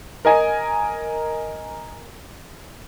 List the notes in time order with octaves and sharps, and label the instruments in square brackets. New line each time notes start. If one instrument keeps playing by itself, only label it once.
[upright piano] A#4 D#5 G#5